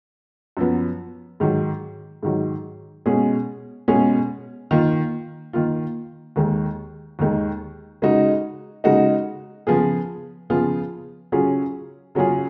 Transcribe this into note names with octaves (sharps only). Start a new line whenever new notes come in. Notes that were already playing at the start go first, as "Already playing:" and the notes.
F#2 F3 B3
G#2 D#3 F#3
G#2 D#3 F#3
B2 G#3 C#4 G#4
B2 G#3 C#4 G#4
D#3 A#3 F4
D#3 A#3 F4
D#2 D#3 G#3
D#2 D#3 G#3
C#3 G#3 D#4 F#4
C#3 G#3 D#4 F#4
C#3 F3 B3 F4 G#4
C#3 F3 B3 F4 G#4
C#3 F#3 C#4 F4 G#4
C#3 F#3 C#4 F4 G#4